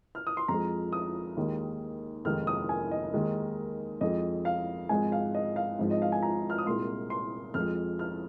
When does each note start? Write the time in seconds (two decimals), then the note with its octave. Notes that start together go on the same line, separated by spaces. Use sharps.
0.15 F6
0.27 D#6
0.37 C6
0.48 F2 F3 G#3 A#5
0.93 D#6
1.37 D#2 D#3 G#3
2.25 F1 D#2 D#3 G#3 F6
2.47 D#6
2.69 G#5
2.91 D#5
3.14 D#2 D#3 G#3
4.01 F2 F3 G#3 D#5
4.45 F5
4.89 G#1 G#2 F3 G#3 G#5
5.12 F5
5.35 D#5
5.56 F5
5.79 G#1 G#2 F3 G#3
5.91 D#5
6.02 F5
6.12 G#5
6.23 A#5
6.50 F6
6.58 D#6
6.67 C2 A#2 G#3 C6
7.10 C6
7.54 F2 F3 G#3 F6
7.99 F6